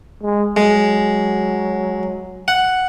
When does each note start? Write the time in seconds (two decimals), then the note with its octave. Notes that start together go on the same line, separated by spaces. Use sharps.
0.22 G#3
0.57 F#3 G#3
2.48 F#5